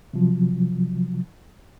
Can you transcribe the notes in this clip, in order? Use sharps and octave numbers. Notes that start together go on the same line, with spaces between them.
C3 F3 F#3